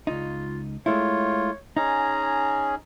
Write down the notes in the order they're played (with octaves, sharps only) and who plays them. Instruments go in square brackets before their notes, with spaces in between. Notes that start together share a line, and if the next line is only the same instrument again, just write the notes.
[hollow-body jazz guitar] C#2 D#4 [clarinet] F4
[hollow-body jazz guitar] G#3 A3 E4 [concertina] F4 [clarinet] C#5
[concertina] C#4 G#4 [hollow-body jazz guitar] D#4 [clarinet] A#5